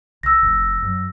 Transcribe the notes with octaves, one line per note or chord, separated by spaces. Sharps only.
C2 E6 A#6
F1
F#2